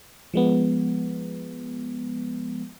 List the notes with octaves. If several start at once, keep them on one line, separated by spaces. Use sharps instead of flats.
F3 G#3 B3